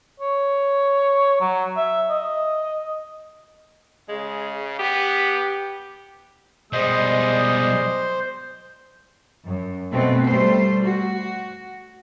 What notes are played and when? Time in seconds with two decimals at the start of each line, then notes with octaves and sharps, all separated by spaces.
0.20 C#5
1.41 F#3
1.77 E5
2.10 D#5
4.09 C#3 G#3
4.79 B3 G4
6.73 B2 G3 G#3 C5 D5 D#5 D#6
9.45 F#2
9.91 B2 A3 C4
10.27 G3 A3 C5
10.84 F#4